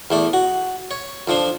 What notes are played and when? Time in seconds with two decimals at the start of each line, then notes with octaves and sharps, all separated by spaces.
0.11 E2 A3 D5
0.33 F#4
0.91 C#5
1.28 F2 F3 D4